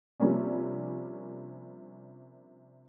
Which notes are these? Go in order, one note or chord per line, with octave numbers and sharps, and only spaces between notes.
C3 F3 G3 A#3 C#4 D4